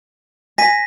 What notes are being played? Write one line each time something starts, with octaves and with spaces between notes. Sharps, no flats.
G#5 A#6 B6 D#7